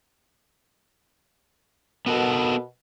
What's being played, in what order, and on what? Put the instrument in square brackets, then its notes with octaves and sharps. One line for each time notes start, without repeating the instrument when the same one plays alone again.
[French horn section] B2 A#4 [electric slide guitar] B3 F#4 A4